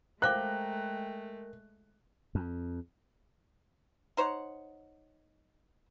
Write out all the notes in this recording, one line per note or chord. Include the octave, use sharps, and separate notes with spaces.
G#3 A3 A#4 C5 F5 G5 D6 F#6
F2
D#4 C5 C#5 F#5